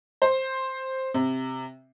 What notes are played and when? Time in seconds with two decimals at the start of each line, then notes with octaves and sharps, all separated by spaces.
0.22 C5
1.14 C3